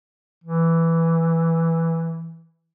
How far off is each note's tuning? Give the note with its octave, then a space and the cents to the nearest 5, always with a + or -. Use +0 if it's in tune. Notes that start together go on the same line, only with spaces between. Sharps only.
E3 +0